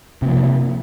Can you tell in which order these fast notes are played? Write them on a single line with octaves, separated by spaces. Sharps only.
C3 A#3 F3